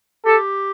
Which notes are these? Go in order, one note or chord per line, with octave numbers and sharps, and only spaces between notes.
G4 A4